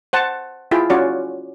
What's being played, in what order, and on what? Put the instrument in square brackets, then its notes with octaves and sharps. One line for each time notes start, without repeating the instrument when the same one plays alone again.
[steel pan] C5 F#5 A5
E4 F4 G#4 G5
C#4 F4 F#4 C#5 D5